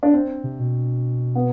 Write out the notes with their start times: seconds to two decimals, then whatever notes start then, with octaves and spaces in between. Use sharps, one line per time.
0.03 D4
0.14 C4
0.44 C3
0.59 B2
1.35 B3